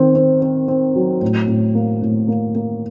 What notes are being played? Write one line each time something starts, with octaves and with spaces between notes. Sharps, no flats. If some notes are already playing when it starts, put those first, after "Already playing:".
Already playing: D#3 C4
C4
C4
C4
F#3
A2
A2
A#3
A2
A#3
A#3